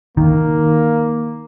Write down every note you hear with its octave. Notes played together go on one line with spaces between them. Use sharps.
D#3 A#3